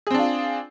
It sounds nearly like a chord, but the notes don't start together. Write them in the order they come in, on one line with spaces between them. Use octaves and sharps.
G#4 C4 D4 F4